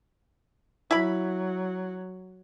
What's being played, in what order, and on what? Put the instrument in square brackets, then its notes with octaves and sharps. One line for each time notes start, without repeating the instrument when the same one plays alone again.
[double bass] F#3 [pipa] E4 B5